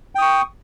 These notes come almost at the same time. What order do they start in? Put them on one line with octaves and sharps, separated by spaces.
G5 D#6 C#6